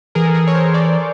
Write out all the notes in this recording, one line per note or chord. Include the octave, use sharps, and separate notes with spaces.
E3 G#4 A#4
A4
G#4 A#4
C#5
A#4 C5
C5 D5